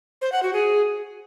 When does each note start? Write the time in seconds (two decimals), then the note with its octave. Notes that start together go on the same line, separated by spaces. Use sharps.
0.22 C5
0.32 F#5
0.43 F#4
0.53 G#4